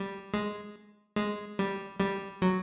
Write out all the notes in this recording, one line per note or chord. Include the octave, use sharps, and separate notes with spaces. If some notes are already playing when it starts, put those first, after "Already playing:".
Already playing: G3
G#3
G#3
G3
G3
F#3